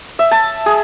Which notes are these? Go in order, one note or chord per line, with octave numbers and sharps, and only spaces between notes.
E5
A5
G#4